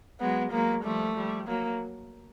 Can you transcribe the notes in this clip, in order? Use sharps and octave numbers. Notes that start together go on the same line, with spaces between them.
F#3 G#3 B3
F#3 G#3 A#3
F3 G3 A3
F3 G3
F#3 A#3